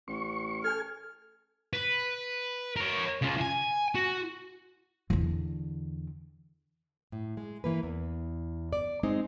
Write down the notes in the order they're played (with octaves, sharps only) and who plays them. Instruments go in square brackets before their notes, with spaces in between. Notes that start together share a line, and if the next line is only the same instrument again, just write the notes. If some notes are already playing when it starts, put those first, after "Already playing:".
[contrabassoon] A1 [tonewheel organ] C#6
[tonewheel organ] A4 G#5 [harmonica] F6
[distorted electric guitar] B4
A#4 C#5
C#3 F4
G#5
F#4
[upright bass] E2 D3
[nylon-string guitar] A2
G#3
E3 A#3 B4
E2
D5
G#3 C4 D#4